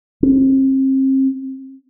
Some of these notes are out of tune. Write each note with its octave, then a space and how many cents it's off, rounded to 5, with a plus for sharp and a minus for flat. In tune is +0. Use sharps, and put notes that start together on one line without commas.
C4 +35